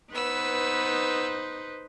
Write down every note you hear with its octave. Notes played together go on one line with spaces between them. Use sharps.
B3 D#4 B4 C5 E6